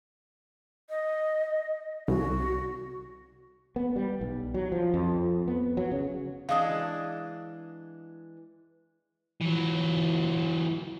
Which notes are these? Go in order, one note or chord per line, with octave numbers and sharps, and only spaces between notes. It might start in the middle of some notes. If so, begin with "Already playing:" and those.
D#5
C2 F#4
B3
G3
B1
F#3
F3
F2
B3
F#3
C#3
E3 G#3 D4 F5 D#6
E3 F#3